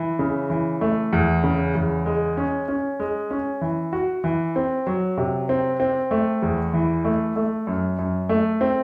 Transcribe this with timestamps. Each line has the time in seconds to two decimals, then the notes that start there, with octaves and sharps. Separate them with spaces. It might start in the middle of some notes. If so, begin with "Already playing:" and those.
Already playing: E3
0.19 C#3
0.50 E3
0.81 A3
1.13 E2
1.44 C#3
1.75 E2
2.06 G#3
2.37 C#4
2.68 C#4
3.00 G#3
3.31 C#4
3.61 E3
3.93 F#4
4.24 E3
4.56 C4
4.87 F#3
5.18 C3
5.49 C4
5.80 C4
6.11 A3
6.42 E2
6.74 E3
7.04 A3
7.36 A3
7.67 F#2
7.99 F#2
8.29 A3
8.61 C4